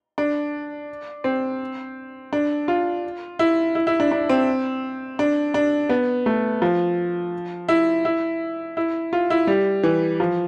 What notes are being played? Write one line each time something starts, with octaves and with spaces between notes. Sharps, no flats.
D4
C4
D4
F4
E4
E4
E4
D4
D4
C4
D4
D4
B3
A3
F3
E4
E4
E4
F4
E4
G3
E3
F3